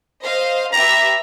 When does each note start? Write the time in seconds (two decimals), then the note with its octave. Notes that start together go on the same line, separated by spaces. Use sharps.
0.23 C5 D#5 F5
0.73 G4 B4 E5 A#5